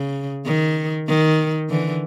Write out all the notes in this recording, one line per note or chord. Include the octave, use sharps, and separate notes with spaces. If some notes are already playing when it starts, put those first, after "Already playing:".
Already playing: C#3
D#3
D#3
D3 E3